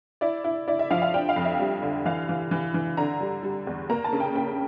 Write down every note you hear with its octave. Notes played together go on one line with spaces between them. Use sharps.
E4 D5
E4
E4 D5
E5
F3 F5
F5
D4 G5
F5
F2
E5
G3
D3
E3 F5
E3
E3
E3
D3 A#5
G3
G3
E2
A#3 A#5
A5
C#3
G5
C#3 G5